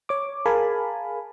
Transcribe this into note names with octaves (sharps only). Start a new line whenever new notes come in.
C#5 D6
G#4 A#4 F5 G#5 A5 B5